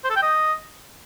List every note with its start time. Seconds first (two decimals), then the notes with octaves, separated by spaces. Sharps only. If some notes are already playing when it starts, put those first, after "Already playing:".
0.04 C5
0.10 A4
0.16 G5
0.22 D#5